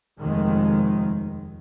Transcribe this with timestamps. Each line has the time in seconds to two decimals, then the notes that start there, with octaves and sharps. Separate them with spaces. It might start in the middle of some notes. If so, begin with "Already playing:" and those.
0.19 F1 D#2 D#3 G#3